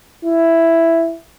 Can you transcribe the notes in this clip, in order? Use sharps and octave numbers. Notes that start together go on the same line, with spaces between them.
E4